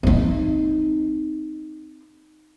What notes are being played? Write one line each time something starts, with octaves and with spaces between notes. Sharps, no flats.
C4 D#4